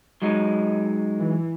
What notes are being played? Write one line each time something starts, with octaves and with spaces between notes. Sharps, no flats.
F#3 G#3 D#4
E3